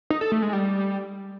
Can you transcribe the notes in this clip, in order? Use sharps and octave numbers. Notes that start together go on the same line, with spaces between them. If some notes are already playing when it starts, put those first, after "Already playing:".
D#4
A4
A3
G#3
G3